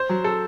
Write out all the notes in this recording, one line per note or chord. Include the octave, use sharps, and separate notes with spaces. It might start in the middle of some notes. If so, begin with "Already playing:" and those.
Already playing: C5
F#3
A4